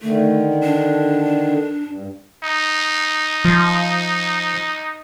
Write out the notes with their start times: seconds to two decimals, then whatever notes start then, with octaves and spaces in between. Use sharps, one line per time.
0.02 D3 D#3 A3
0.63 D4
1.87 G2
2.43 D#4
3.45 F3